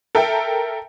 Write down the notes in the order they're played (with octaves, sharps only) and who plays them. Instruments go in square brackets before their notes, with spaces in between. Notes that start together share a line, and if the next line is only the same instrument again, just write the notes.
[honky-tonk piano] A4 A#4 E5 G5